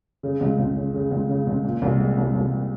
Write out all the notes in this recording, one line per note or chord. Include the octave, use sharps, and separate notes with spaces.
C#3
C#2
C#2
C#3
C#3
C#2
C#3
C#2
A#2
C2
G#3
C2
C2